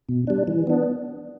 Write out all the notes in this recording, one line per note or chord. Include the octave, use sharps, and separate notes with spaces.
B2
G3 D4
E3
B3 D4